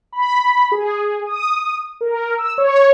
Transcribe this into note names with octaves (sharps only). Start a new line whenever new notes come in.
B5
G#4
D#6
A#4
E6
C#5